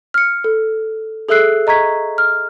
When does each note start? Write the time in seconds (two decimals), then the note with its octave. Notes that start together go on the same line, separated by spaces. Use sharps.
0.14 F6 C#7
0.44 A4
1.29 G#4 A4 E5 E6 F#6 C7
1.67 D#5 A#5 C#6 G#6 B6
2.18 F6